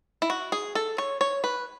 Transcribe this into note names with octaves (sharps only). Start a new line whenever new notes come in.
E4
F#4
G#4
A4
C#5
C#5
B4